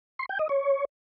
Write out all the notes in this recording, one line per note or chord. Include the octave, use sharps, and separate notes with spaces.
C6
G5
D#5
C#5